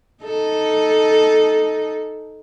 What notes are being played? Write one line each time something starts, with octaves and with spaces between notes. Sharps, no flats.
D#4 A4